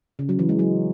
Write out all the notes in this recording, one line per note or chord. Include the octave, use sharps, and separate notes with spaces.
C#3
F#3
E3
G#3
F#3